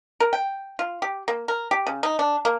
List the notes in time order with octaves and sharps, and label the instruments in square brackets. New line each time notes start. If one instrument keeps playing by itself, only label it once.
[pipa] A#4
G5
F4
G4
A#3
A#4
G4
C#3
D#4
D4
A#3